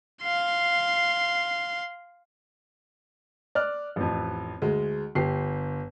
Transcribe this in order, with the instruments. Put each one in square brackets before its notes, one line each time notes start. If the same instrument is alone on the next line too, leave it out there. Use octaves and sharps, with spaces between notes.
[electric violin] F5 C6
[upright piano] D5 F6 F#6
A1 F2
D2 G#3
G1 G4 C7